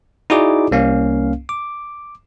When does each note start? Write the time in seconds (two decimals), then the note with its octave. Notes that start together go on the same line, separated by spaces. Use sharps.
0.30 D#4 E4 F#4 G#4 D5 D6
0.71 C2 A#3 C#4 F5
1.49 D6